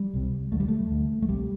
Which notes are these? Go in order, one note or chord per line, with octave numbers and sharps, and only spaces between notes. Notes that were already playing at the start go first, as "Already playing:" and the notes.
Already playing: G3
C2 C3
D2 D3 A3
G3
A3
D2 D3
A3
C2 C3 G3